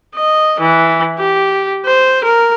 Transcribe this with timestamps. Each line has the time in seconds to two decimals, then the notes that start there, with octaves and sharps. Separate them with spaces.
0.15 D#5
0.60 E3
1.18 G4
1.86 C5
2.24 A#4